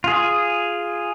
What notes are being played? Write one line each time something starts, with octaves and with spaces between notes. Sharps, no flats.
F4 G#4